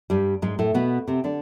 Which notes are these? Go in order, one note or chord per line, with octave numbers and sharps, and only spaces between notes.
G2 G3
G#2 G#3
A2 A3
B2 B3
C3 C4
D3 D4